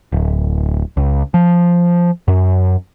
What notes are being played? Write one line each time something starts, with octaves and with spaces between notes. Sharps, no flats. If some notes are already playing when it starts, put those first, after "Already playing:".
D1
C#2
F3
F#2